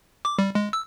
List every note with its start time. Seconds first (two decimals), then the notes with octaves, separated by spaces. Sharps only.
0.25 D6
0.39 G3
0.55 G#3
0.73 E6